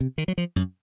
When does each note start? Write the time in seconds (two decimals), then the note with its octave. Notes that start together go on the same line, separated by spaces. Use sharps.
0.01 C3
0.18 D#3
0.28 F#3
0.38 F3
0.56 F#2